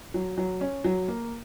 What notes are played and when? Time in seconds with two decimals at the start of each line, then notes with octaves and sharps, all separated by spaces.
0.14 F#3
0.37 F#3
0.61 C#4
0.84 F#3
1.08 A#3